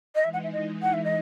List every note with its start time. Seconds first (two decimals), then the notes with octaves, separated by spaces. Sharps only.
0.15 D#5
0.24 E3 G#3 D#4 E5
0.33 F#5
0.43 E5
0.52 D#5
0.82 F#5
0.93 E5
1.04 D#5